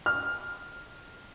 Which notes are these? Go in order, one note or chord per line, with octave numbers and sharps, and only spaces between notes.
F6